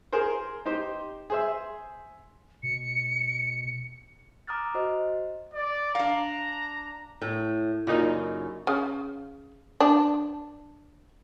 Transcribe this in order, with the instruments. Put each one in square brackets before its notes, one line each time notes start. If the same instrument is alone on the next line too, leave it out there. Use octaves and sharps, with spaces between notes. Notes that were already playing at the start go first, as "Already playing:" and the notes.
[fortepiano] G#4 A#4 C5
D#4 G4 C5
G#4 C5 E5
[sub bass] B2 [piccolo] C#7
[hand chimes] A#5 D6 D#6 F6 F#6 A6
F#4 C5 D#5
[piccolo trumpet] D5
[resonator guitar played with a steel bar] D4 F5 [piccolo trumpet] A#5
[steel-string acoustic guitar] A2
[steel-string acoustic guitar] F#2 C#3 [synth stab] A#2 D#4
[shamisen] C#3
D4